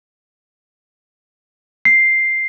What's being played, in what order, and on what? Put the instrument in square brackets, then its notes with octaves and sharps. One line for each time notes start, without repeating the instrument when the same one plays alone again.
[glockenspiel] C7